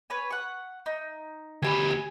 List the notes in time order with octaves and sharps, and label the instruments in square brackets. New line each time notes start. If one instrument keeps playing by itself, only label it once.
[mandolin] B4 C#5 G#5
F#5 C#6
D#4
[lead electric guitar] D2 G4 [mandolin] G#5 A5 B5
[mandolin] G#5